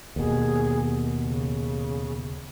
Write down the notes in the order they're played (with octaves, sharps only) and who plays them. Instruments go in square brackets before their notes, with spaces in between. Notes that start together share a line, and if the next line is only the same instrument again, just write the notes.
[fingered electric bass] D#2 B2 [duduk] G#4
[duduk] C#3